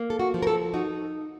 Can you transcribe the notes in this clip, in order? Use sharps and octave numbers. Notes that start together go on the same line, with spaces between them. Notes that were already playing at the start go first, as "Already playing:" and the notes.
Already playing: A#3
A4
F#4
F3
A#4
A4
D#4 F#4